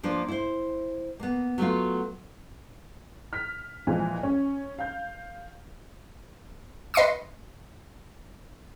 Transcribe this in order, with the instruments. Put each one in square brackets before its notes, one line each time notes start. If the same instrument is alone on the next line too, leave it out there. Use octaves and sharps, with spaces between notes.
[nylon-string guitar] F3 A#3 D4
E4 C5
A#3 B3
F#3 A3 B3 F4
[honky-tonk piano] F6 B6
A#2 E3 F3 G#3
C#4
F5 G6
[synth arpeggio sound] B4 D#5 C6 C#6 D#6